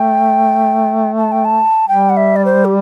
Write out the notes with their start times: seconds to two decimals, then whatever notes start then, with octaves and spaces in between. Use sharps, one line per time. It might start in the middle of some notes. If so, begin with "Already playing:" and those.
Already playing: A3 G5
1.18 A5
1.32 G5
1.45 A5
1.88 G3 G5
2.10 F#5
2.17 E5
2.36 D5
2.45 C5
2.65 G4